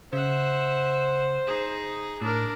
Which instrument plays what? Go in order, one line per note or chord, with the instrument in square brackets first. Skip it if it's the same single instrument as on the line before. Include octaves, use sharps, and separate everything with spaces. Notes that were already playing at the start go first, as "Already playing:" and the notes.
[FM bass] C#3 [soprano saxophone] C5 [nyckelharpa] E5 F#5
[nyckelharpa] D#4 G#4
[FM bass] A2 [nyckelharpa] D4 A#4